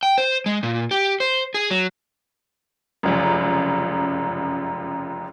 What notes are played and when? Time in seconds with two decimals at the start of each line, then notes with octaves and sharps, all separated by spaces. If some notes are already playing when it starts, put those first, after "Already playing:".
0.03 G5
0.18 C5
0.46 G#3
0.63 A#2
0.91 G4
1.20 C5
1.54 G#4
1.70 F#3
3.03 F1 C#2 F#2